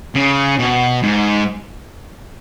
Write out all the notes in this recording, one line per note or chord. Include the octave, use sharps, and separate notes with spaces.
C#3
B2
G#2